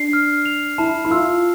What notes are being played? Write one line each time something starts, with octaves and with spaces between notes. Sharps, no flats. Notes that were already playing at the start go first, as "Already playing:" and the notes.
Already playing: D4 C7
F6
F7
E4 A5
E4
F4 E6